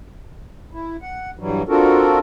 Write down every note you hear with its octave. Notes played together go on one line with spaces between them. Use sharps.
E4
F#5
G2 E3 F#3 G3
C4 D4 F4 F#4 A4 A#4